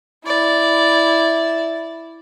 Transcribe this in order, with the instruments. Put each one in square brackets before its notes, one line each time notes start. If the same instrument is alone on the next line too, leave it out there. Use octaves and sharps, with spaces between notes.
[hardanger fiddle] E4 D5